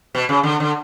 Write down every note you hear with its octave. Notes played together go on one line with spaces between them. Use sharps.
B2
C#3
D3
D3